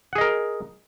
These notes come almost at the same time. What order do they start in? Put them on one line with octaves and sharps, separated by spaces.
F#5 G#4 D#5 A#4